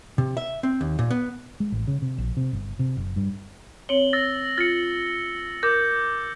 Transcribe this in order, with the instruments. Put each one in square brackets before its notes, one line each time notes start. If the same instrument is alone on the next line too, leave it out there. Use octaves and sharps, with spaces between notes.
[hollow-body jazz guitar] C3
E5
C4
D#2
A#2
B3
[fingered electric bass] G#3
A1
C#3
C3
A#1
C3
G1
C3
F#1
G2
[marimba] C4 C#5 [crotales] F#7 G7
[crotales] E6 A6 A#6
[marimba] F4 [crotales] A6 A#6 C#7
[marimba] A#4 [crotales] D6 G6